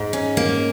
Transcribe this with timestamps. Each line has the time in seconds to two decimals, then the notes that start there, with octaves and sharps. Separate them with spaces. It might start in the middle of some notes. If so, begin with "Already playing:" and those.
Already playing: G#2
0.13 C#4
0.37 A#3